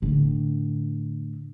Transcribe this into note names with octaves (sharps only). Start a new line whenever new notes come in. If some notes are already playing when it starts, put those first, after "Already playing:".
A2 D3